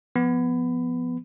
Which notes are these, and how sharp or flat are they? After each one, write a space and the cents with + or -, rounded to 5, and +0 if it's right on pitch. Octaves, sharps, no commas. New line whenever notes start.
F3 +0 B3 +0 B5 +25